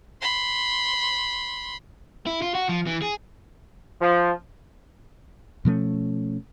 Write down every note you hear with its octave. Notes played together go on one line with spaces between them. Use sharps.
B5 C6
E4
F4
F#4
F3
E3
G#4
F3
B2 F3 A3 C#4